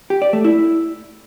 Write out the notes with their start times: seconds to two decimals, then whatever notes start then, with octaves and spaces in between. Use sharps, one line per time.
0.10 G4
0.22 D5
0.33 A3
0.44 E4